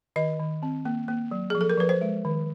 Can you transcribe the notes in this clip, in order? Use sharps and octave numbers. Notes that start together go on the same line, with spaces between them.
D#3 D#5
D#3
C4
A#3
A#3
F#3
F3 G#4
A4
A#4
F3 B4
C5
G#3
D#3